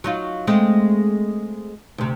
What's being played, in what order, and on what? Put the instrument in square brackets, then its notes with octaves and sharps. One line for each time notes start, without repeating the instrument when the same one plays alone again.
[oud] F#3 D#4 F4
G#3 A3 C4
D2 C3